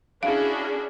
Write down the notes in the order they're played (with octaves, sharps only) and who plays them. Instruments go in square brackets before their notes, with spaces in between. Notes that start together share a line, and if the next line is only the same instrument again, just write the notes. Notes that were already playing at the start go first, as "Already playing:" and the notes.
[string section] C#4 E4 F#4 [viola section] D4 G#4 [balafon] F5